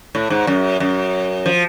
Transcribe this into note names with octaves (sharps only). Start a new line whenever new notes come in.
A2
G#2
F#2
F#2
F3